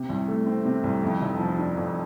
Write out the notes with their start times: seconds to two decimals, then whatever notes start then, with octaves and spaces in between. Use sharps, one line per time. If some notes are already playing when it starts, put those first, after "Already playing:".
Already playing: C3
0.09 C2
0.28 A3
0.46 C4
0.65 C3
0.84 C2
1.03 F2
1.22 F1
1.39 F3
1.59 D4
1.77 F2